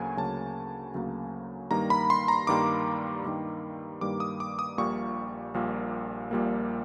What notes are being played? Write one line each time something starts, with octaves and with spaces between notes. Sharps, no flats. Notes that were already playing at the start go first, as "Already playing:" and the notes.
Already playing: D2 C#3 F#3 A#3 G#5
D2 C#3 F#3 A#3 A5
D2 C#3 F#3 A#3
G2 D#3 G3 A#3 A#5
B5
C6
A#5
G2 D#3 G3 A#3 D6
G2 D#3 G3 A#3
G2 D#3 G3 A#3 D6
D#6
D6
D#6
A#1 A#2 G3 A#3 C#6
A#1 A#2 G3 A#3
A#1 A#2 G3 A#3